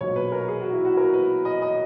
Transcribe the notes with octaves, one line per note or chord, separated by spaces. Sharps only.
B1 A#2 F#3 C#5
B4
A#4
G#4
F#4
E4
F#4
A#4
B4
D#5
D#5